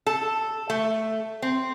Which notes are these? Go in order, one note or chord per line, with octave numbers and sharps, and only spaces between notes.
A4
A3
C4